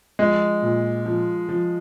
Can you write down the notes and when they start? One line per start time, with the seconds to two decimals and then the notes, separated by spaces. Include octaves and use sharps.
0.19 F3 G#3
0.62 A#2
1.05 F3
1.49 F3